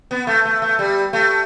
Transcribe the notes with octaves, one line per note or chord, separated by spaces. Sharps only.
B3
A3
A3
A3
G3
A3